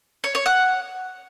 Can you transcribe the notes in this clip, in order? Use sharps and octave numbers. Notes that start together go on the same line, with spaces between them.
C#5
C#5
F#5